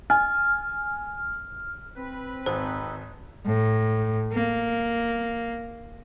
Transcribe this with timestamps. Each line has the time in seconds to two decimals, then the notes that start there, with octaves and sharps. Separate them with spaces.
0.10 G#5 F6
1.96 C4 B4
2.46 G#1 D#4 A4 C5
3.46 A2
4.32 A#3